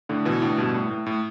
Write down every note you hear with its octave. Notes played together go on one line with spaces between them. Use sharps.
A2 D3
B2 E3
A2 D3
G2 B2
A2
A2
A2